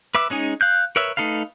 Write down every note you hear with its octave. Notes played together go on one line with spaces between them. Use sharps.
B4 E5 D6 E6
G#3 C#4 D#4 G#4
F5 F#6 G6
A#4 B4 C#5 E5 E6
A3 D#4 A4 B4 F5